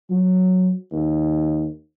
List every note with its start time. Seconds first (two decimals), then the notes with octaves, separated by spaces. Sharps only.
0.11 F#3
0.92 D#2